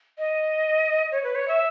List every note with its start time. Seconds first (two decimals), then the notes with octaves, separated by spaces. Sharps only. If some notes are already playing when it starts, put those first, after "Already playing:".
0.18 D#5
1.12 C#5
1.24 B4
1.35 C#5
1.48 E5